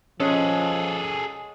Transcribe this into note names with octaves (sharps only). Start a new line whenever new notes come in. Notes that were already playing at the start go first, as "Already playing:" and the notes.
F3 G#3 C#4 G#4 A4 C#5 F#5